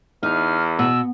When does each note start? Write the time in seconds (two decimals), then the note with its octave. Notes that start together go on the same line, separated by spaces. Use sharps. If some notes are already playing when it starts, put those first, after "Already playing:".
0.23 E2 D#4 F6
0.79 B2 E6